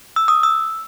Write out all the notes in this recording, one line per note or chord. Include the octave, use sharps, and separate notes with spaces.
E6
D#6
E6